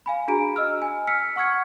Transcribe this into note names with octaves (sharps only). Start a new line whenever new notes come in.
F5 G#5 B5
D4 F#4 G#4 A#5 D7
D#5 E6 F6
G#5
E6 F6 B6 C#7
F#5 C#6 F6 G#6 C#7